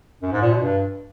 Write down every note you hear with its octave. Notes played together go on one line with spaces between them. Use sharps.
F#2
G#2
A#2
B2
G2